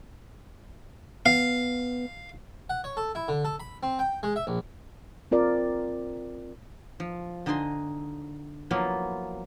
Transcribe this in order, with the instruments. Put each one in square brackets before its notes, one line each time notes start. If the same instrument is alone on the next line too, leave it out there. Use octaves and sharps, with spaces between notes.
[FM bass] B3 [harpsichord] F5
[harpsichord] F#5
C#5
A4
E4
D3
A4
B5
C4
G5
G#3
E5
A#1
[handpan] C4 F4 A#4 D5
[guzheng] F3
D3 D#4 D#5 G#5 C6
F3 F#3 A#3 B3 E4 F4